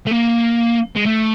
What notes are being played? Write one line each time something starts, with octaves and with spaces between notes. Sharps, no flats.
A3
A#3
G#3
A3